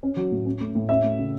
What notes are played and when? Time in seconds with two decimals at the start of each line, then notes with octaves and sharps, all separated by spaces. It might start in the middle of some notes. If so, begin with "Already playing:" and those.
0.03 C#4
0.17 F#3
0.31 A2
0.46 C#4
0.60 A3
0.75 A2
0.89 C#4 E5
1.03 A3
1.19 C#3